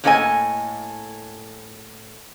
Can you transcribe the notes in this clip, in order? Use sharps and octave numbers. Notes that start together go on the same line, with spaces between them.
A2 A#3 D4 A4 D#5 G#5